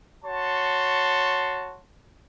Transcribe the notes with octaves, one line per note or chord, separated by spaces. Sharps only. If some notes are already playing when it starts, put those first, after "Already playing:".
F#4 C#5 A5 C6